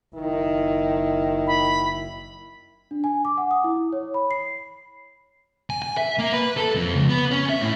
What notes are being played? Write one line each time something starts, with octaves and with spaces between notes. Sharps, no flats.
F#1 D#3 E4
B5
D4
G#5
D6
F#5
D#6
E4
C#5
B5
C7
G#5
G#5
E5
A#3
B4
A4
F2
C#2
B3
C#4
E5
A2